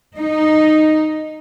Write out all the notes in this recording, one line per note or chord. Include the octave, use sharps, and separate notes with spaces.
D#4